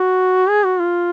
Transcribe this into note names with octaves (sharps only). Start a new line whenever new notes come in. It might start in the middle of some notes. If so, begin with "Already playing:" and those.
Already playing: F#4
G#4
F#4
F4